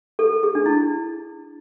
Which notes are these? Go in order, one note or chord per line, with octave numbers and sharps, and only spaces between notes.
A4
G#4
D4
E4